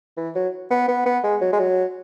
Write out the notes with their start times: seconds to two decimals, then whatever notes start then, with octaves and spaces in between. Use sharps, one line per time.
0.17 E3
0.35 F#3
0.71 B3
0.88 B3
1.06 B3
1.24 G#3
1.41 F#3
1.53 G#3
1.59 F#3